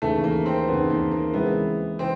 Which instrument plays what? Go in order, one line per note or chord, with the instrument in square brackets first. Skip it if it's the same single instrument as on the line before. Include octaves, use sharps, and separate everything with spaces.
[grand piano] D#2 C#3 E3 [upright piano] A3
[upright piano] A#3
C4
[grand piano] D#2 C#3 E3 [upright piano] B3
[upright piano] A#3
A#3
[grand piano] C#3 E3 G#3 C4 E4 [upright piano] B3
[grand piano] C#3 E3 [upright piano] C4